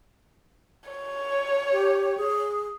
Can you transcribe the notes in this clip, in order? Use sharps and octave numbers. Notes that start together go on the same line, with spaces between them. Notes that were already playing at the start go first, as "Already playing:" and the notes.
C#5
G4
G#4